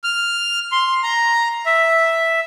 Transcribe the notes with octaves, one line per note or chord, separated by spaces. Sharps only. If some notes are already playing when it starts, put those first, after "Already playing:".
F6
C6
A#5
E5